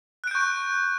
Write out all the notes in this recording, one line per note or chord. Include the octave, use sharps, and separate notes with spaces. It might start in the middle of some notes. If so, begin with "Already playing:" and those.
C#6 F#6 G6 D7